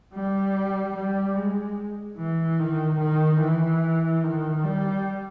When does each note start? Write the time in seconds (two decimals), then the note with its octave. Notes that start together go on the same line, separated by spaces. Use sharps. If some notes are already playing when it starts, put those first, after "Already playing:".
0.14 G3
0.96 G3
1.36 G#3
2.18 E3
2.60 D#3
3.00 D#3
3.41 E3
4.24 D#3
4.64 G3